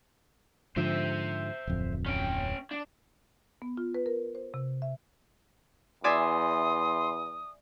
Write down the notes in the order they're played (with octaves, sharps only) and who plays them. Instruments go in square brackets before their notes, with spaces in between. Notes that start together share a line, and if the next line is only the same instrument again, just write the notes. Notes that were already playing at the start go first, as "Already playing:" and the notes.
[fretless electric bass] G#2 D3 F3 [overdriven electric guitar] C5 E5
[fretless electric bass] D1 F2
[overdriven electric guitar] C#4 G5
D4
[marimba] B3
F4
B4
A#4
C5
C3
E5
[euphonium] E2 [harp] D5 E5 G#5 [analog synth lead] C6 [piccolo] D#6